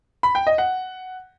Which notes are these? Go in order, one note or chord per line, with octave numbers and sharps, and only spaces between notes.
B5
G5
D#5
F#5